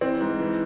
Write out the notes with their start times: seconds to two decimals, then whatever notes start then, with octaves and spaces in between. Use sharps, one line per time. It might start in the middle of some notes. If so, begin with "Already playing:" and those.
0.01 E3 C4
0.21 G#2
0.40 E3